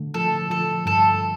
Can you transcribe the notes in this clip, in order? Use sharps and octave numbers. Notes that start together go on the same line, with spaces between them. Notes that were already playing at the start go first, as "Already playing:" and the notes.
Already playing: D3 A3
F3 A4
F3 A4
G2 A4